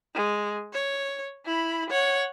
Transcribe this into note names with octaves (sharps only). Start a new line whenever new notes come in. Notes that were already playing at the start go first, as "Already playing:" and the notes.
G#3
C#5
E4 B5
C#5 F#5